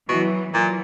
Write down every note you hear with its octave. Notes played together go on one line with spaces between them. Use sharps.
B2 E3 F#3
A#2 E3 F#3